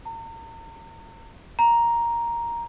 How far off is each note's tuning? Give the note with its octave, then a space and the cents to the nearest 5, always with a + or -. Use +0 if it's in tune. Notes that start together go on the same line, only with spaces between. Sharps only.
A#5 -40
A#5 +5